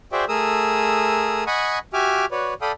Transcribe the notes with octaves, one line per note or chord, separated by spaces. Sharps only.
F#4 G#4 C5 D5 E5 G5
A3 G#4 A#4 D#6 E6
D#5 F#5 G#5 B5 C#6 D#6
F#4 G4 E5 G#5 D6 F6
F#4 B4 C#5 D5
A4 D5 F5 G5 B5 D#6